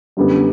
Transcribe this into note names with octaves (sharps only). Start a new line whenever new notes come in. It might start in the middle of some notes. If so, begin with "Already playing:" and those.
F#2 D3 G3 B3